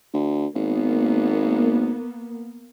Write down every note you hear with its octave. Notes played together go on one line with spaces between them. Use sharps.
D2
G#1 A#3 B3